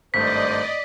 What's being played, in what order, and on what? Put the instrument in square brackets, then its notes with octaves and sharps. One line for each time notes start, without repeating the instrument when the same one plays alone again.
[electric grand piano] G#1 G2 A3 [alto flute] C5 [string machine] D5 D#5 [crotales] B6